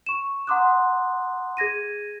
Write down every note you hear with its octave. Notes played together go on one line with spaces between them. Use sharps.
C#6 E7
F#5 A#5 C6 D6 D#6 F#6
G#4 G#6 A#6 D#7